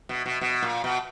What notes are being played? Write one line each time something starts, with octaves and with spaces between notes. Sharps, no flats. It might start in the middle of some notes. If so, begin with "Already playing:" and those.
B2
B2
B2
A#2
B2